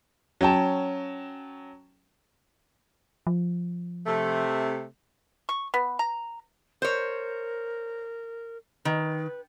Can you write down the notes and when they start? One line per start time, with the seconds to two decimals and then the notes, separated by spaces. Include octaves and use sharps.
0.41 F#3 C#4 G5 A5
3.27 F3
4.06 C3 A3
5.49 C#6
5.74 B3
5.99 A#5
6.82 A#4 C5 C#5
8.85 D#3 B4